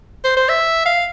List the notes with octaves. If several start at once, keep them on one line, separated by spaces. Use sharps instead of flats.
C5
C5
E5
F5